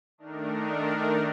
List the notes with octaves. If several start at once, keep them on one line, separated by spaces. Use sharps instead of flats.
D#3 A3 D4 D#4 A#4